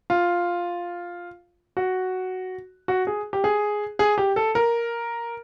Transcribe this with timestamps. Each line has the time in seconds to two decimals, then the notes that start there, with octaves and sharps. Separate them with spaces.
0.10 F4
1.77 F#4
2.88 F#4
3.07 G#4
3.33 G4
3.44 G#4
3.99 G#4
4.18 G4
4.36 A4
4.55 A#4